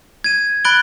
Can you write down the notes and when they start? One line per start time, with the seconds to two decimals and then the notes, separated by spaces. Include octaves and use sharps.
0.24 G#6 D#7
0.65 B5 F#6 A6 D7 G7